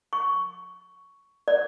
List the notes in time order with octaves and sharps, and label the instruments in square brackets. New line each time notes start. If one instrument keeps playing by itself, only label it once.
[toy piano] C#6
D5